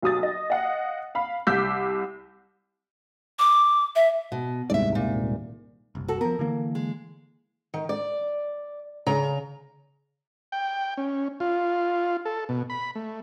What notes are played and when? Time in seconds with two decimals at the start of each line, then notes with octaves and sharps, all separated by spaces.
0.02 B1 F#3 D#6 A6
0.23 D#5
0.50 D#5 F5 F#5
1.15 F5 B5
1.47 C2 D6 E6 G6 B6
3.39 D6
3.96 E5
4.32 B2
4.70 D#1 C2 G#2 D5 E5
4.95 A#2
5.95 F#1 C2
6.08 F#4 A4
6.21 F3 B3 A#4
6.39 D3 E3 A#3
6.75 G#3
7.74 D#3
7.89 D5
9.07 C#3 A#5
10.52 G5
10.97 C#4
11.40 F4
12.25 A4
12.49 B2
12.70 B5
12.95 A3